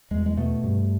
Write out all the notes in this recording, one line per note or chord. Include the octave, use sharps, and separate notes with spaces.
E2 G#3
G#3
B2 A3
G2